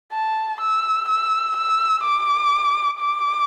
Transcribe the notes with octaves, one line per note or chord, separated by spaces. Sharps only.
A5
E6
E6
E6
D6
D6